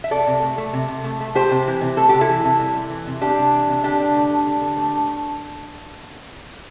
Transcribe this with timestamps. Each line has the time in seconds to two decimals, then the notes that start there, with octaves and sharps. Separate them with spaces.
0.04 E5
0.11 C3 A4 D5
0.27 C3
0.42 A3
0.58 A3
0.73 C3
0.88 C3
1.04 A3
1.20 A3
1.35 A3 G4 C5
1.51 C3
1.67 E3
1.81 C3
1.97 A3 A4
2.09 C3 G4
2.21 E4 A4
2.29 E3
2.44 C3
2.60 G3
2.75 C3
2.90 E3
3.07 C3
3.22 G3 D4 G4
3.38 C3
3.53 E3
3.69 C3
3.84 D3 D4 G4
4.00 D3
4.15 A3
4.31 A3
4.47 D3
4.62 D3
4.77 A3
4.93 A3